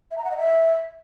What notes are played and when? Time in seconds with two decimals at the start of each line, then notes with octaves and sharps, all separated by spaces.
0.11 E5
0.18 A#5
0.24 F#5
0.31 D#5
0.38 E5